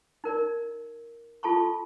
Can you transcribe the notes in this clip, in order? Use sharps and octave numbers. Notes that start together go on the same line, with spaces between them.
D#4 A#4 D5
F4 A4 A5 C6 C#6